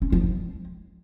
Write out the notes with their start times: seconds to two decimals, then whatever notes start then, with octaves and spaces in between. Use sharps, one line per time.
0.02 C#4
0.12 F3
0.23 G#3